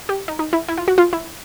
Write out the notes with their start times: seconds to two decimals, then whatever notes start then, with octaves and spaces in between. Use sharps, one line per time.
0.09 G4
0.28 D#4
0.39 D#4
0.53 E4
0.68 E4
0.78 F4
0.88 F#4
0.98 F4
1.13 E4